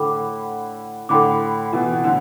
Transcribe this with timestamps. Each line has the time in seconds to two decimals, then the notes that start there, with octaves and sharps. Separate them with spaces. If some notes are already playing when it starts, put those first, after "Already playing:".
Already playing: A2 D3 A4 G5 B5 D6
1.09 A2 D3 A4 G5 B5 D6
1.73 B2 E3
1.93 B2
2.04 A2 D3